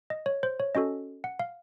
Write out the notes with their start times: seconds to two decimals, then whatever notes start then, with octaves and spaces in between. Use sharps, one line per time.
0.10 D#5
0.26 C#5
0.43 C5
0.60 C#5
0.75 C#4 F#4 A4 D#5
1.24 F#5
1.39 F5